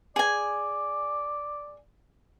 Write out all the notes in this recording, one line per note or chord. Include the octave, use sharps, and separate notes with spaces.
G#4 D5 G#5